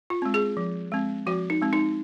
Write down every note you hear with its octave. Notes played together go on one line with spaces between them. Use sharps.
F4
G#3 C4
G#4
F3
G#3 C4
F3 F#4
D#4
G#3 C4
D#4